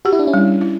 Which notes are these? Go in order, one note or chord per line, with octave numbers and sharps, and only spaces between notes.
F#4 G4
E4
D4
C#4 E4
G3
E4